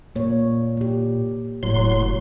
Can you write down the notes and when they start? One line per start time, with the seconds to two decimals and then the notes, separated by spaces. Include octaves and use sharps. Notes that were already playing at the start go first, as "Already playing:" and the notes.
0.16 A#2 A#3 C#5
0.77 A#3 G4
1.63 F1 A2 F#3 C6